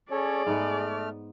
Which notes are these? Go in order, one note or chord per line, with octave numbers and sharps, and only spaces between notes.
C#4 G#4 A4 C#5 D5
G#2 A3 B3 F6